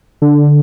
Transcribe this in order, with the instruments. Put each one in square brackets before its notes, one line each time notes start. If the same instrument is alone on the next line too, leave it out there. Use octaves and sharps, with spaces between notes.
[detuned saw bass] D3